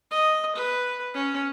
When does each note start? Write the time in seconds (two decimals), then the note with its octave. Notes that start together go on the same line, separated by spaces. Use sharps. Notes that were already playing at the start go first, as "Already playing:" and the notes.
0.11 D#5
0.56 B4
1.14 C#4